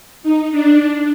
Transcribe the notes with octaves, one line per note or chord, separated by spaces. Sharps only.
D#4
D4